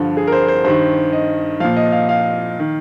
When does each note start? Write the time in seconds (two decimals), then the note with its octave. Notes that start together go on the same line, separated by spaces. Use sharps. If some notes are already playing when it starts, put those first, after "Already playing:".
Already playing: G2 D3 F3
0.17 G#4
0.27 A#4
0.32 C5
0.48 C5
0.64 G2 D#3 C5
1.13 D#5
1.60 A#2 F3 F5
1.77 D#5
1.92 F5
2.09 F5
2.60 D#3